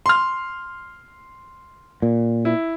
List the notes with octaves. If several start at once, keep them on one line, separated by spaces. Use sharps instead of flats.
C6 F6
A#2
E4